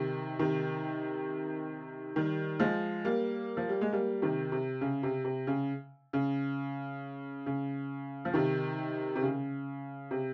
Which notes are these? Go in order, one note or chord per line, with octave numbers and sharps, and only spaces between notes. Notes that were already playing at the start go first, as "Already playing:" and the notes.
Already playing: C3 D#3
C3 D#3
D#3 G3
F3 G#3
G3 A#3
F3
G3
G#3
G3 A#3
C3 D#3
C3
C#3
C3
C3
C#3
C#3
C#3
F3
C3 D#3
C3
C#3
C3